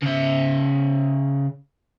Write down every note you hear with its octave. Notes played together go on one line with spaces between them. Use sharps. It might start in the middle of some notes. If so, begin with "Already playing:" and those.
C#3 E5